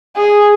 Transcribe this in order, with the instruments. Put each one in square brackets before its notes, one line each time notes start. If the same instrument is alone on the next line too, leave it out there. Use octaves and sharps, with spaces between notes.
[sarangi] G#4